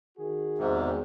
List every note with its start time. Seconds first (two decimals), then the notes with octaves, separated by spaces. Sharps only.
0.18 D#3 F#4 G#4
0.58 E2 G#2 C3